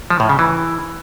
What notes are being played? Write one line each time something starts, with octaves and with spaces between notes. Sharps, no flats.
F3
A2
C#3
E3